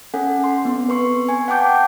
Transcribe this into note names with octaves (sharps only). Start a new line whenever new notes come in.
C#4 A4 F#5 G#5
C6
B3 C4
B4 C6 C#6
G#5
F#5 G5 A5 D6 G6